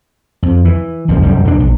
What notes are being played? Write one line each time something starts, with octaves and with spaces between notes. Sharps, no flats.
F2
E3
D1 C#2 F#2 F3
F1 F#2 G3
B1 D4
A#1